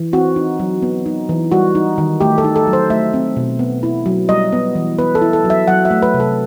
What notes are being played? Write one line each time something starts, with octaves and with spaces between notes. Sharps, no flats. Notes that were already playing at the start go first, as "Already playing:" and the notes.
Already playing: E3
C4 F#4
D#4
F#3
B3
D#4
E3
G3 F#4
D#4
D#3
A3 G4
A4
D#4
A4
F#3
C5
A3 E5
C4
B2
B3
E4
F#3
G3 D#5
B3
E3
B3 B4
A4
E4
A4
F#3
E5
F#3 F#5
E5
A3
B4
C3
A4